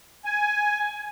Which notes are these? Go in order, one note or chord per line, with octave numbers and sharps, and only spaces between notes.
G#5